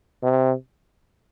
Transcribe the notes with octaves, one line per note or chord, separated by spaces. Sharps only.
C3